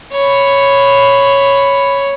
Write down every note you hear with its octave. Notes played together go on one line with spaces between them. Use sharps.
C#5 B5